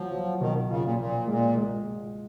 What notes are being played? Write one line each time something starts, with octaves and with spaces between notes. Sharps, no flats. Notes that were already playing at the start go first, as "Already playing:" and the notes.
Already playing: F3 F#3
F#3
B2 D#3
C#3 F4
A#2
A#2 F3
A#2 G#3
G#3